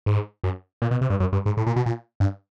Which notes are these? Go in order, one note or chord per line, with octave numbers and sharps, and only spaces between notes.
G#2
F#2
A#2
B2
C3
G2
F#2
G2
G#2
A2
A#2
B2
A#2
G2